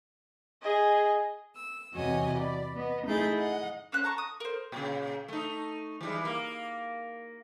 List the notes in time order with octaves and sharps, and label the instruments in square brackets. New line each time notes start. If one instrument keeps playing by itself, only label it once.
[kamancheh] G#4 D#5
[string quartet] E6
E2 C3 F#4 C#5 D#5 G#5
D5 B5
B3 D#5
A3 D#4 E4 G#4 G6 A6
D#5 F#5
[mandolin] A#3 C#4 C5 F#6
A5 A#5 C#6
D#6
A#4 C5
[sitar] A#2 C#3
A3 D#4
E3 G3 G#3
A#3